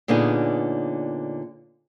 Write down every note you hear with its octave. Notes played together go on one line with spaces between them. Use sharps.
A#2 D3 B3 C#4 D#4 G#4